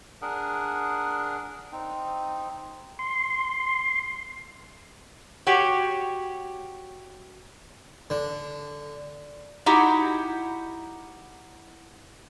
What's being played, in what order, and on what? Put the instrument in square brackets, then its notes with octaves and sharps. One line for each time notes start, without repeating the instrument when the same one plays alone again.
[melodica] D4 G#4 A#4 F#5
C4 D#4
[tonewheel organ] C6
[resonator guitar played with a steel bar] F#4 G4 C#5
[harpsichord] D3
[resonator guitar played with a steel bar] D#4 E4 F#4 G4